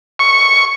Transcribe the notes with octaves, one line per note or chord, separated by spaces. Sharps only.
C#6